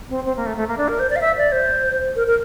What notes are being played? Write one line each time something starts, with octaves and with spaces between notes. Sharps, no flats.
C4
C4
A#3
A3
A3
A#3
D4
A#4
C5
D5
F5
E5
D5
C5
A#4
A#4